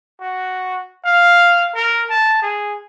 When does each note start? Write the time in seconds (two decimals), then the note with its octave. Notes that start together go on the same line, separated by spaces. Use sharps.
0.20 F#4
1.05 F5
1.74 A#4
2.10 A5
2.42 G#4